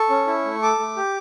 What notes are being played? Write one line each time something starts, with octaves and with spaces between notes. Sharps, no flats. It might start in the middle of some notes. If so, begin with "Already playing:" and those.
Already playing: A4 C#6
C#4
E4
A3
A4 D6
A3
G4